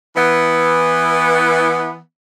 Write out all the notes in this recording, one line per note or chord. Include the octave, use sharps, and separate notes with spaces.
E3 B3